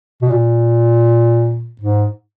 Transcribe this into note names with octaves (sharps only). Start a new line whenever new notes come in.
B2
A#2
G#2